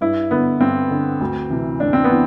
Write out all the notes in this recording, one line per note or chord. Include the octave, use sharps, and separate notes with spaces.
G2 E4
D3 B3
G2 C4
D3
D2
C3 E3
D2 D4
C4
B3
E3